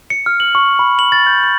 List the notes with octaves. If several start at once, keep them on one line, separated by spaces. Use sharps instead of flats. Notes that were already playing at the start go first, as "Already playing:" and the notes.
C#7
F6
F#7
C#6
B5
F#7
A6
G6
A6